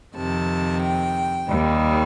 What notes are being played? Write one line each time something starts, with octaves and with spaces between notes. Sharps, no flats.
F2 C3 D#3 A5
G5
D#2 D#3 G3